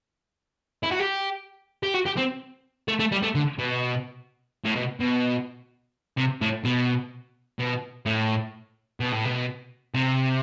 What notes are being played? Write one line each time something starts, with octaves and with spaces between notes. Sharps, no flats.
E4
F#4
G4
G4
F#4
G4
C4
A3
A3
G3
A3
D3
B2
A2
B2
B2
C3
A2
B2
B2
A2
B2
A2
B2
C3